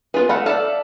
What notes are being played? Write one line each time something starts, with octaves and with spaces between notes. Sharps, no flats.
B3 F4 G#4 B4
A3 F5 F#5 B5
A4 D5 E5 F5 A5